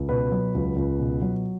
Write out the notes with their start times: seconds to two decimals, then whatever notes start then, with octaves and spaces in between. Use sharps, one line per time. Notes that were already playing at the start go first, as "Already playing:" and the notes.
Already playing: C#2
0.09 B2 B4
0.32 F#3
0.55 C#2
0.76 C#2
0.99 B2
1.22 F#3